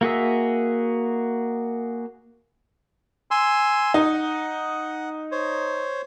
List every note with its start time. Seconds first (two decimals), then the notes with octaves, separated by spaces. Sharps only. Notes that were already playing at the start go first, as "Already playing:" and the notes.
0.01 A#3 F#4 G#4 E5
3.31 G#5 C6 E6
3.94 D#4 F#5
5.31 C5 C#5